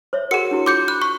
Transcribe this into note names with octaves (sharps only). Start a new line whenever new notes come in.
C5 C#5 E5
F#4 G#4 A#4 F#5 C#7
D4 E4 F#4
F4 C6 D6 G6 C#7
B5 F#6
C#6